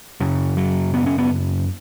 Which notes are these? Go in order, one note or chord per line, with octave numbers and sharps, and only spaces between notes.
F#2 C#3 F#3
F#3
B3
C#4
B3